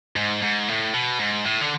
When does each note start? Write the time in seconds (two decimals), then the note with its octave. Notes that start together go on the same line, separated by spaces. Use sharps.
0.16 G#2
0.42 G#2
0.68 A2
0.94 B2
1.20 G#2
1.45 A2
1.61 D3